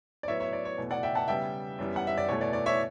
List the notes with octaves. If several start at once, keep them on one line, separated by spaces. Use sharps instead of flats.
D5
A2 F#3 B3 C#5 E5
C#5 E5
D5
C#5
E2 B2 A3
D5 F#5
E5 G5
F#5 A5
C#3 G3 B3 E5 G5
F#2 E3 G3 B3
F#5
E5
D5
E2 B2 A3 C#5
D5
D5
C#5 E5